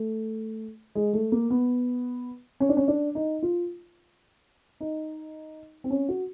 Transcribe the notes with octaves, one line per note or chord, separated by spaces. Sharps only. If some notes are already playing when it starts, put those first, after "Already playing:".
Already playing: A3
G#3
A3
A#3
B3
C#4
D4
C#4
D4
D#4
F4
D#4
C4
C#4
F#4